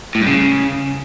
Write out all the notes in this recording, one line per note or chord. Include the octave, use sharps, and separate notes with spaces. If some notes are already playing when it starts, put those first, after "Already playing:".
A2
G2
C#3